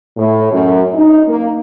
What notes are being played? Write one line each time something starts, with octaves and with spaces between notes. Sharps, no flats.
A2
F#2
D#4
A#3